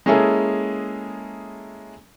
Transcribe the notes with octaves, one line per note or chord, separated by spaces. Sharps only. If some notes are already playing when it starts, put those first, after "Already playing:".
G#3 A#3 C#4 E4 G#4 A4